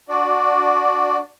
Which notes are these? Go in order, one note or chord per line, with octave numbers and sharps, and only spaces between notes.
D4 F#4 D5